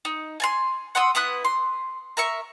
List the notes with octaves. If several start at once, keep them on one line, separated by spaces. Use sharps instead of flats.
D#4
G#5 A5 C6
F#5 C6 D#6 E6
B3 E4 D#6 F#6
C6
A#4 E5 C#6